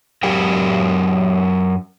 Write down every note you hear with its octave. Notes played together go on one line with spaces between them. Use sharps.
F#2 F#3 G4 A#4 G5